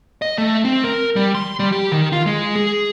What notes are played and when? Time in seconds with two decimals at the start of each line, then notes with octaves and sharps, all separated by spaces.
0.22 D#5
0.38 A3
0.65 C4
0.84 A#4
1.16 G3
1.35 C6
1.59 G3
1.72 G4
1.92 D#3
2.12 F4
2.26 G#3
2.55 G#4